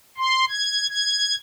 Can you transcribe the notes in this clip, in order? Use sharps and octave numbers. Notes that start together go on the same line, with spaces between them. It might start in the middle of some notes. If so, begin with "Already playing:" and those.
C6
G#6
G#6